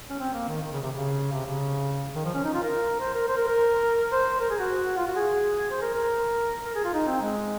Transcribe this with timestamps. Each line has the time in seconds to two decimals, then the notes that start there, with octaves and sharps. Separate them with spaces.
0.10 C#4
0.20 C4
0.34 A#3
0.48 D#3
0.61 D#3
0.72 C#3
0.82 C3
0.92 C#3
1.32 C3
1.46 C#3
2.15 D#3
2.25 F3
2.34 C#4
2.45 D#4
2.54 F4
2.63 A#4
3.00 C5
3.14 A#4
3.28 C5
3.37 A#4
3.48 A#4
4.12 C5
4.40 A#4
4.51 G#4
4.60 F#4
4.97 F4
5.07 F#4
5.16 G#4
5.71 C5
5.82 A#4
5.95 A#4
6.66 A#4
6.75 G#4
6.84 F4
6.94 D#4
7.07 C4
7.22 G#3